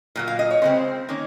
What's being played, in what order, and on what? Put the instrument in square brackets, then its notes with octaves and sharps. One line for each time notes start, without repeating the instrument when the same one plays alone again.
[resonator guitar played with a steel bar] A#2 F#3 A#3
F5
D#5
C#5
C#3 G#3 C4 C5
D#3 A#3 C#4